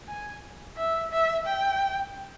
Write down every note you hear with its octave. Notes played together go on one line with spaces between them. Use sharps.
G#5
E5
E5
G5